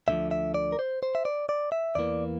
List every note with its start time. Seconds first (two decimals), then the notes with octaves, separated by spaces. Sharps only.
0.08 D2 D3 F3 E5
0.31 E5
0.54 D5
0.72 A#4
0.79 C5
1.03 C5
1.15 E5
1.25 D5
1.49 D5
1.72 E5
1.95 E2 E3 A#3 D5